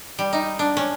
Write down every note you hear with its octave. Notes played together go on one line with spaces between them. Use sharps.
G3
D#4
D4
C#4